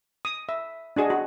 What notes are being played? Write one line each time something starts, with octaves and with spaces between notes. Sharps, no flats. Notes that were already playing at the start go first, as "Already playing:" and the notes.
D#6
E5
D4 F#4 G#4 D#5
F#4